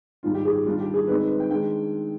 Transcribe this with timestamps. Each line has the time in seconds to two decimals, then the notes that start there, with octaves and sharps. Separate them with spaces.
0.23 G#2 D#3 G3 F4
0.34 G4
0.45 G#4
0.55 G4
0.66 D#3 G3 D4 F4
0.80 G4
0.94 G#4
1.07 D#3 G#3 C4 D#4 B4
1.18 B4
1.29 B4
1.40 G5
1.50 D#3 G#3 D4 G5